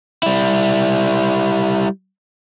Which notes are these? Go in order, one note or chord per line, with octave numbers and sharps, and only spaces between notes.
G3 E4